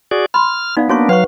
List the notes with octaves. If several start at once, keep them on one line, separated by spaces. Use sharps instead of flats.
F#4 G#4 D5
B5 C6 F6
B3 D#4 D5 F5
A#3 B3 D4 F#4 C#5 C#6
F#3 B4 F5 F#5 C#6